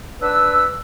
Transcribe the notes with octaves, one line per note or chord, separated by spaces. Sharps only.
D4 B4 E6